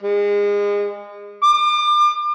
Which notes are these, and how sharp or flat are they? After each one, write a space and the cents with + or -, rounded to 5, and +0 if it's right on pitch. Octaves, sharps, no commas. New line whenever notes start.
G#3 -30
D6 +35